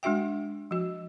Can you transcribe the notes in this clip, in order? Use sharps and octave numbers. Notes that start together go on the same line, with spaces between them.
G#3 D4 F#4 E5 G5
F3 F#4